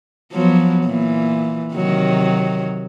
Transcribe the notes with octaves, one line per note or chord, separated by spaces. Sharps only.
F3 F#3 B3
A#2 E3
C3 D#3 F#3